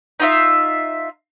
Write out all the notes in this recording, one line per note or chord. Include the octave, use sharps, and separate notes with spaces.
D#4 F4 E5